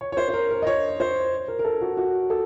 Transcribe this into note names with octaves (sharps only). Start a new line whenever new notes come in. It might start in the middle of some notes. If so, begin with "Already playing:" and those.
C#5
C#5
C5
C5
A#4
A#4
D#5
C#5
C5
A#4
A#4
A4
F#4
F#4
A4